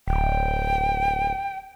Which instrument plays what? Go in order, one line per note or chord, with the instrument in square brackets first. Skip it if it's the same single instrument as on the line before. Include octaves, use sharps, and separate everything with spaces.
[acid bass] D1 [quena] G5